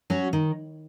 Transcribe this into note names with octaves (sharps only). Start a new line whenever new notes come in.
F#3 C#4 F#4
D#3